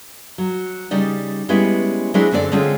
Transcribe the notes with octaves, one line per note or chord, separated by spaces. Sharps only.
F#3
C#3 G3 D#4 D5
G3 G#3 B3 C#4 E4
F#3 G#3 C4 D4 E4 G#4
F#2 D3 C4 G#4 D5
D3 G#3 C4 C#4 F4 G#4